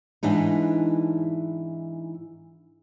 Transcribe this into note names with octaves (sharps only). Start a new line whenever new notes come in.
G#2 E3 D4 D#4